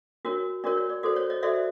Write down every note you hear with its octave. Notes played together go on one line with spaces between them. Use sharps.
D4 F#4 A#4 C#5
D4 F#4 A#4 C#5 D5
C#5
D5
F#4 A4 C5 D5
C#5
C#5 D#5
F#4 A4 C5 D5 E5